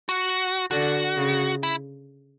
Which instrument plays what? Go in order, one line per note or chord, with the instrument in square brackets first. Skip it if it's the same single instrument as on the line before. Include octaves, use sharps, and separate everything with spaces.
[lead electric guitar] F#4
[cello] D3 [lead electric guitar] F#4
[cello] C#3
[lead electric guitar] E4